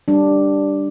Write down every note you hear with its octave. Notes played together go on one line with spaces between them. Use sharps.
G3 D4